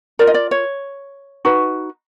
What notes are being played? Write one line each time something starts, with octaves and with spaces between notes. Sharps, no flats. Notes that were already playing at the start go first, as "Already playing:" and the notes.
F4 A#4 D5
D#5
D5
C#5
D#4 F#4 B4